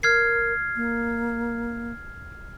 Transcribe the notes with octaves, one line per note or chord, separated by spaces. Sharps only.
A#4 F6 G#6 C7
A#3